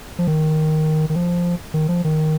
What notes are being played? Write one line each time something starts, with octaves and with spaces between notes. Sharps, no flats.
F3
D#3
D#3
F3
D#3
F3
D#3